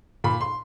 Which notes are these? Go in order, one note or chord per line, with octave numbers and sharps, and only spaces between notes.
A#2 B5
C6